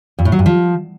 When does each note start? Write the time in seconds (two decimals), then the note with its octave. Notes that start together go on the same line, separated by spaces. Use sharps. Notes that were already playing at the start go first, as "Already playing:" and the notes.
0.19 F2
0.25 A2
0.32 F#3
0.39 G2
0.46 F3